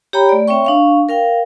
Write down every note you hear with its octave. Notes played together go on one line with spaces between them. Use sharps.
G4 C#5 G5 A#5 B5
A3 D5
C4 C#5 E5 G5 C#6
D4 F5 C#6
A#4 F5 G5